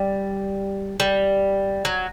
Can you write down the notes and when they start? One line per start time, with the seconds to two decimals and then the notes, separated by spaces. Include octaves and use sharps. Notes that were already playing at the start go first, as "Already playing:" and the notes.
Already playing: G3
1.00 G3
1.85 F#3